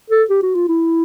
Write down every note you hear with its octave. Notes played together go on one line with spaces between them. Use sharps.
A4
G4
F#4
F4
E4